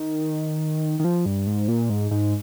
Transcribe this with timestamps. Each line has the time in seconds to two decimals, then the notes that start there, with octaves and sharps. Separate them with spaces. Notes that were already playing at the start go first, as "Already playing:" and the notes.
Already playing: D#3
1.00 D#3
1.04 F3
1.26 G2
1.47 G#2
1.68 A#2
1.90 G#2
2.11 G#2